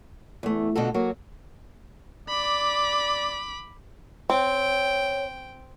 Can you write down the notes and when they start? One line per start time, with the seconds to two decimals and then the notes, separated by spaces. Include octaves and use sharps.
0.43 E2 A3
0.75 B2 D3 F4 F#4 A4
0.94 F#3 A#3 F#4
2.29 D5 B5 D6
4.30 C4 C#5 G5